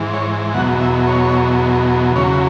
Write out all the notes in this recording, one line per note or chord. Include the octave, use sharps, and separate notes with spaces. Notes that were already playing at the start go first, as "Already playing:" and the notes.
Already playing: G#2 E3
C#5
E2 B2 F#3 F#5
E5
C#5
E2 C#3 F#3 C#5